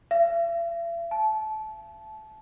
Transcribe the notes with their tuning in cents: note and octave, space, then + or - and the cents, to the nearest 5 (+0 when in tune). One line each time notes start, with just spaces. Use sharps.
E5 +45
A5 -25